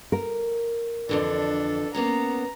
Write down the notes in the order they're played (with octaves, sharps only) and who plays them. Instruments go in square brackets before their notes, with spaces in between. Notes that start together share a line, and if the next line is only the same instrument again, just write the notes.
[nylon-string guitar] A#4
[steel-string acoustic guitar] F2 D3 E3 [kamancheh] D4 A4
[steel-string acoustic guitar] A#3 B3 C#4 [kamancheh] A#5